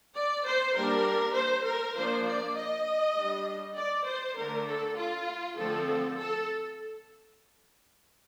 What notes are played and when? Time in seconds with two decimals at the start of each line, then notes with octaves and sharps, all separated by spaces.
0.16 D5
0.46 C5
0.76 G3 A#3 D4 A#4
1.36 C5
1.67 A#4
1.97 F3 A#3 D4 C5
2.27 D5
2.56 D#5
3.17 G3 D4
3.78 D5
4.07 C5
4.38 D3 A3 D4 A#4
4.68 A4
4.98 F4
5.59 D3 F3 A3 C4 A4
6.18 A4